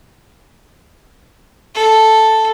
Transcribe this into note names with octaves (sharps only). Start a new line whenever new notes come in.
A4